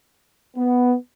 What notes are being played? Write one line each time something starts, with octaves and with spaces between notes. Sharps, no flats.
B3